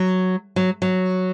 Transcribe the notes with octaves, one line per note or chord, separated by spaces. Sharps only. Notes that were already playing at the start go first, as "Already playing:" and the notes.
Already playing: F#3
F#3
F#3